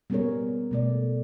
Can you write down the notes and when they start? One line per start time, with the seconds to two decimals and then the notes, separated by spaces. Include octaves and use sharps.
0.10 G3 B3 C#4 G#4 A#4 C#5
0.71 B2 A3 D5